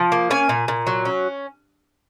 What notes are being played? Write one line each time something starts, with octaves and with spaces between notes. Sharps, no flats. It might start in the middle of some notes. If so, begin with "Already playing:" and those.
Already playing: F3
A#3
C#4 G#5
A#2
A#2
F#3
C#4